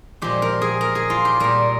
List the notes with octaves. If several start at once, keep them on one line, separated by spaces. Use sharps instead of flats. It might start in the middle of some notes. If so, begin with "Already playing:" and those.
A#2 F3 G#3 G4
A#4
G#4
A#4
G#4
F4
G4
A#2 G3 A#4